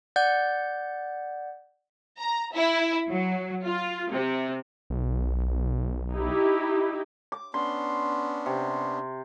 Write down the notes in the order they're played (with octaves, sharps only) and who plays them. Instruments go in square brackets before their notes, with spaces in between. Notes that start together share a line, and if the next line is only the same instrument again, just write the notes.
[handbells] D5 F#5 G6
[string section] A#5
E4
F#3
F4
C3
[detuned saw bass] B1
[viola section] D#4 E4 G4
[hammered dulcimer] D6
[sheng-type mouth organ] B3 C#4 D4 [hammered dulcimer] C6
[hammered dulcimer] C3